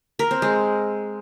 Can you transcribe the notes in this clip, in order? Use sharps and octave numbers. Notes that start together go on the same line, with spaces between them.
A#4
C4
G#3